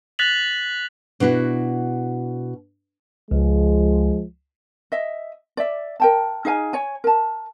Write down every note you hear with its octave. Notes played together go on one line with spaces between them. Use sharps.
F#6 A6 B6 F7 F#7
B2 D4 E4 F#4
C#2 F3 G#3
D#5 E5
D5 E5
A#4 G5 A5
D#4 G#4 F5 G#5
C#5 G#5
A#4 A5